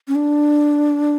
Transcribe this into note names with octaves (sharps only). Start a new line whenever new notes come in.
C#4
D4